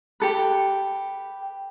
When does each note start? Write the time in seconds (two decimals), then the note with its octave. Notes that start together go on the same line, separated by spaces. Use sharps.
0.20 G4 A4 B4